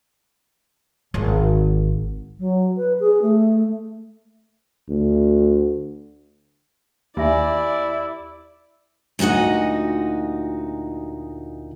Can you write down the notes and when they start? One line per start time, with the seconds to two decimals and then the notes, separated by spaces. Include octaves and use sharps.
1.14 G#1 D3
2.39 F#3
2.77 B4
3.00 G#4
3.22 A3
4.89 D2
7.17 D#2 E4 G4 D5 E5 G#5
9.19 D2 A#2 D#4 F#4 D#5